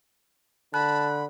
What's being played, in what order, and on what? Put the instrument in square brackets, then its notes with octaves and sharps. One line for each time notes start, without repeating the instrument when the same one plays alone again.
[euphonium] D3 [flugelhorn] A5 [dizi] B5 [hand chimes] F#6